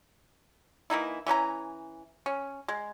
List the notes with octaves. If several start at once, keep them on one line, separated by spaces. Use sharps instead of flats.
E3 A#3 D#4 E4
E3 C#4 B4 A#5
C#4
G#3